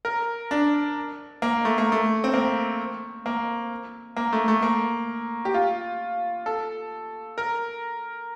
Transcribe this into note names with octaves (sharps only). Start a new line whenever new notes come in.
A#4
D4
A#3
A3
A#3
A3
C4
A#3
A#3
A#3
A3
A3
A#3
G4
F4
A4
A#4